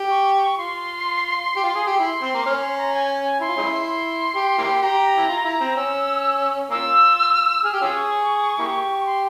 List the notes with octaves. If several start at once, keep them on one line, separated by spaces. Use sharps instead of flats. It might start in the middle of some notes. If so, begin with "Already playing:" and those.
Already playing: G4
C#6
F4 C6
G4
F4
G#4
G4
E4 C6
C4
A#3
C#4 F6
C6
A#5
G#5
G#5
E4 C6
F4
G#3 C#4 E4
C6
G4
A#3 E4 G4
G4 A#5
E4
F4
E4
C4
C#4 E6
A#3 C#4 F4 E6
G#4 F6
G4
C#4 F4 G#4 E6
C#6
A#3 E4 G4
C#6
C6